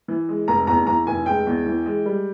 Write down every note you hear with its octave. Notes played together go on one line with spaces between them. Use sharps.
E3
G#3
F1 A#5
E2 A#5
E3 A#5
F1 G#5
G#3 G5
E2
E3
G#3
G3